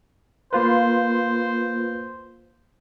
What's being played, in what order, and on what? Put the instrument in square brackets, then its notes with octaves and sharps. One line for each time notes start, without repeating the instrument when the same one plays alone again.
[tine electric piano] A#3 F4 B4 [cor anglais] C5